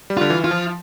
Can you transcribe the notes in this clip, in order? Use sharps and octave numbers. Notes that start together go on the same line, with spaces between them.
G3
D3 F4
E3
F4
F3